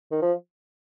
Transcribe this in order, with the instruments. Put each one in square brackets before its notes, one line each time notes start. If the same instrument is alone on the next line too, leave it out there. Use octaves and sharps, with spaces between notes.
[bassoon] D#3
F3